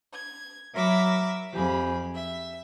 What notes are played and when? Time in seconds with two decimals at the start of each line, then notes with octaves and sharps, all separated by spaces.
0.13 G#6
0.74 F#3 A#4 E5 B5 D6 E6
1.53 F2 G4 G#4 B5
2.13 E5